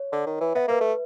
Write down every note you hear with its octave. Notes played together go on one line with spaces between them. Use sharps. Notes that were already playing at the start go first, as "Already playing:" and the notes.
Already playing: C#5
D3
D#3
E3
B3 E5
A#3 B4
A3